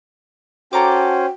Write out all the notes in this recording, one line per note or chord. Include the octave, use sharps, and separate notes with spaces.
C#4 F#4 A4 C5 G5 A#5 D6